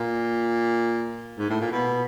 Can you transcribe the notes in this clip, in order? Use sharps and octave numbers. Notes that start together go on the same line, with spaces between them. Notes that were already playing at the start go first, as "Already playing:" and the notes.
Already playing: A#2
G#2
A2
A#2
B2